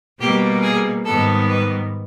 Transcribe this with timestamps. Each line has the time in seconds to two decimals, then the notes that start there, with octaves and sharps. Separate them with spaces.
0.20 B2 G3 A#3 G4
0.62 G#4
1.05 G#2 D#3 G3 B3 A4
1.48 B4